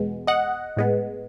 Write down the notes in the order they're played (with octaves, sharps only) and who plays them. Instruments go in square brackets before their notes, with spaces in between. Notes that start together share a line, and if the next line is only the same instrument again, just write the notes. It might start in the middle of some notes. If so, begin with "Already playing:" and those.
Already playing: [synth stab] E2 B2 G#3 B3
D#5 F#5
A2 G#3 B3